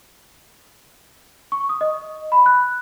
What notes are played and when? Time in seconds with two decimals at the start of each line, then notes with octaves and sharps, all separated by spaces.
1.52 C#6
1.69 D#6
1.81 D#5
2.32 B5
2.46 F#6